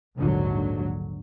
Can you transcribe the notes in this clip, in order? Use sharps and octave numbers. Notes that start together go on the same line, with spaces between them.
A#1 D#2 G#2 D3 F#3